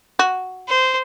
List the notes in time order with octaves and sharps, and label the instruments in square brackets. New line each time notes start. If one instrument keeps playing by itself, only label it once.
[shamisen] F#4
[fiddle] C5